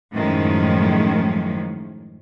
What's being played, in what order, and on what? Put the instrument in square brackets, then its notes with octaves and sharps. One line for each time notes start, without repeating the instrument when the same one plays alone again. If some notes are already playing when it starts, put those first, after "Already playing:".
[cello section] F#2 A2 D#3 F3 G#3 C#4